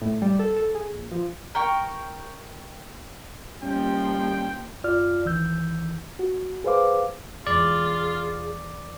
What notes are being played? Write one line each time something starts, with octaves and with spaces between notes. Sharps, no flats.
A2
G3
A4
A4
G#4
A#1
F3
A#4 G5 C#6
D#2 F3 G3 C#4 G5
F#2 F4 D5 F6
C2 D#3 E3 E6 G6
F#4
G#4 B4 C5 F5 D6
E1 E2 F4 G#4 D5